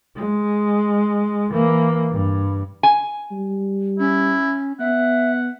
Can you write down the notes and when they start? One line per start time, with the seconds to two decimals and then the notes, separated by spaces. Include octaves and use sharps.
0.17 G#3
1.50 E3 A#3
2.12 G2
2.83 G#5
3.32 G3
3.99 C#4 E4
4.80 B3 E5 F#5